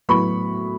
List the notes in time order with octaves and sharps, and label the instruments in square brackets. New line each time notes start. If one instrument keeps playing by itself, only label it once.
[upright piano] A2 F#3 B3 B5 C#6